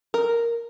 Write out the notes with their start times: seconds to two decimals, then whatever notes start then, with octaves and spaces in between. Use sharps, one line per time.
0.14 A#4